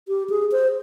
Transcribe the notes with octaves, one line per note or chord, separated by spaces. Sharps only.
G4
G#4
C5